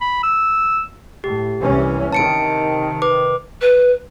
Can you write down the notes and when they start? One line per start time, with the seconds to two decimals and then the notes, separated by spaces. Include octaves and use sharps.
0.01 B5
0.23 E6
1.24 A2 G4
1.61 C2 E3 C#4
2.13 C3 D#3 A5 C#7 D7
3.02 B4 D6
3.61 B4